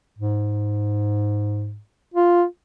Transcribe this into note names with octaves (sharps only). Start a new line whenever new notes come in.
G#2
F4